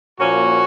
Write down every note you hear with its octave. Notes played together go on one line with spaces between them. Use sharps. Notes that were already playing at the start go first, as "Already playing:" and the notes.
A#2 F3 A#3 C#4 F#4